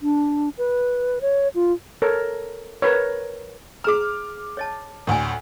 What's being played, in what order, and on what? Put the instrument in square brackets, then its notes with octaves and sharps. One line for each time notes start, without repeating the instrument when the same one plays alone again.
[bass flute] D4
B4
C#5
F4
[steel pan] A4 A#4 C#5
A#4 B4 C#5
[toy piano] G#4 A#5 [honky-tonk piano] D6 F6
[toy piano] C#5 D#5 A5
[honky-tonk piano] D2 A2 [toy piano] G#5 D#6